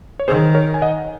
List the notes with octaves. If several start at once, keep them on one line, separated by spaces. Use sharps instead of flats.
C#5
D#3 G#4 C5
A#4 C#5
G#5
D#5 F#5